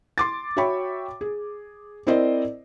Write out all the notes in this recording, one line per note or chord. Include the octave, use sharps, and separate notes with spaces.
C6 D6 A6
F#4 C#5 E5 G5 B5 C#6
G#4
C4 E4 A#4 C5 D5 D#5